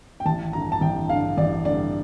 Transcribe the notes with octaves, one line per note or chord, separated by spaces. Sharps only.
G5
A1 A5
G2 D3 A#5
A5
A1 G5
G2 D3 F5
A1 D5
G2 D3 D5